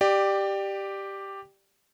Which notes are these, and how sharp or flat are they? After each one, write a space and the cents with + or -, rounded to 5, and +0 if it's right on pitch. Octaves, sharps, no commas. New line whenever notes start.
G4 +0 D5 +20